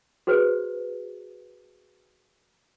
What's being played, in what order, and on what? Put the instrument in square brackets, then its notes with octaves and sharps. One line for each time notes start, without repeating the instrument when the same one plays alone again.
[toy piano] F#4 G#4 B4 C5